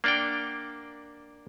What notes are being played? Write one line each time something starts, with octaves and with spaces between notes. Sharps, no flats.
A#3 D4 D5 F#5 G5